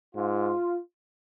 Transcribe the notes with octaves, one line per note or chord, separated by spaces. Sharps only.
G#2 F4